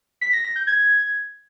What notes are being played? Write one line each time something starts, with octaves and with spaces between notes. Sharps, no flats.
B6
A#6
A#6
G6
G#6